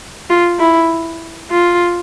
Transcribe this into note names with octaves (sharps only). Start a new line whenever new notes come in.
F4
E4
F4